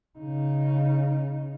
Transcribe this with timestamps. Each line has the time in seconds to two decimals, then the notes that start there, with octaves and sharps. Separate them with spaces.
0.19 C#3 D#4